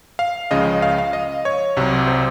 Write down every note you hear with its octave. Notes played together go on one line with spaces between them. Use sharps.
F5
C#2 C#3 F3 D#5
F5
F5
D#5
C#5
C2 C3 F#3
C5